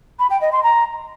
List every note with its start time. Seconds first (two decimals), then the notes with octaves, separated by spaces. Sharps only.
0.19 B5
0.30 G5
0.41 D#5
0.52 C6
0.63 A#5